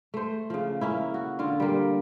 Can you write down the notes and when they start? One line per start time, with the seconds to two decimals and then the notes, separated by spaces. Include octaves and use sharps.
0.14 A3 C5
0.50 C#3 F3
0.81 A#3 C#4 E4
1.14 F#4
1.39 D3 F4
1.60 G3 A#3